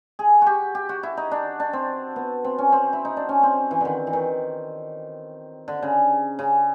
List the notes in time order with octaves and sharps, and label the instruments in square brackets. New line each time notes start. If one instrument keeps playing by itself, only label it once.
[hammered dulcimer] G#4
F#4 G4
G4
F#4
E4
D#4
D4
D4
C4
B3
C4
C#4
C4
E4
D#4
D4
C#4
C4
E3
D3 D#3
E3
D#3
D3
C#3
C#3